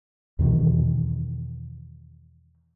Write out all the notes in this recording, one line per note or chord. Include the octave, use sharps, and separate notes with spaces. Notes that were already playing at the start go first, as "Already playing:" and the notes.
E2 B2 D#3 E3